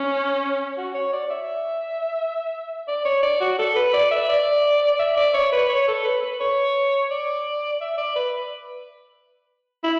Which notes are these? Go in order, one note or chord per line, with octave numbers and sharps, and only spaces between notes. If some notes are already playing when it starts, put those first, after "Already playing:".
Already playing: C#4
F#4
C#5
D5
E5
D5
C#5
D5
F#4
A4
B4
D5
E5
D5
E5
D5
C#5
B4
C#5
A4
B4
B4
C#5
D5
E5
D5
B4
E4